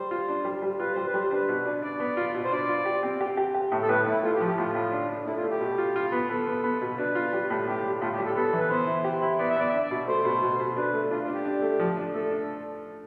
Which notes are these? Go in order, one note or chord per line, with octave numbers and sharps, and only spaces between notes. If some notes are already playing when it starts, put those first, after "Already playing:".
Already playing: G3 C5
F4
D4
G3
G3
F4 B4
G3 C5
B4
G3
C5
D4 B4
B2
D4
D4 D5
B3
F4
B2
C5
D4 D5
F4
G4
C4
G4
G4
G4
A2
A4
A2 B4
A2 E4
A3 F4
G4
F3
G4
A2 F4
A2
D4
D4
A3 E4
F4
A3
G4
B2
F4
F4
B3
B3 A4
B3
B3
B2
D4 B4
F4
G3
A2
A2 G4
G3
A2 F4
G4
G3
A4
B3 A4
E3
B4
B3 C5
E4
G4
E4
B3 D5
E5
B3 D5
D4 E5
D5
B2
A3 C5
B2
B2
B2
D4 B4
A3
D4 F4
F4
D4
G4
D4
A3
F3
D4
A3 A4
D4